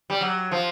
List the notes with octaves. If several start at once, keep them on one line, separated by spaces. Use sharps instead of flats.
G3
F#3
F3